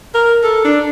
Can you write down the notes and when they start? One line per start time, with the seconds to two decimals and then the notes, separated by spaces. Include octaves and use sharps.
0.15 A#4
0.43 A4
0.64 D4